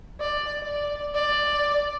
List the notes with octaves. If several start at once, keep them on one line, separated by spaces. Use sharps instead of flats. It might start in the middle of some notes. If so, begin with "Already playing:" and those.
D5
D5
D5